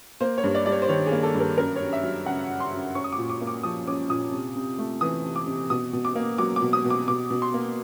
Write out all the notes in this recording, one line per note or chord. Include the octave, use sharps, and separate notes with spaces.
A#3 C5
C#5
G2
D5
G3 D5
C#5
C5
D#3 C#5
G#4
A#3
A4
G2
A#4
F#2 A#4
F#2 C#5
E5
F#3
C#3 F#5
F#2
C6
F#2
C#4 C#6
D#6
D6
A#2
D6
A#3
D6
F3 D#6
C#4 D6
A#2 D#6
C3
C3
A3
E3 D#6
C3
D6
C3
B2 D#6
B2
D6
A#3
F#3 D6
D6
B2
D#6
B2
D6
B2 D6
B2
C6
A#3